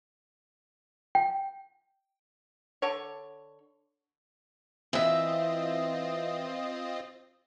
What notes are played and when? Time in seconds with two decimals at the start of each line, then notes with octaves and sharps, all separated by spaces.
1.15 G5
2.82 D3 C#5
4.93 E3 C4 F4 D#5 E5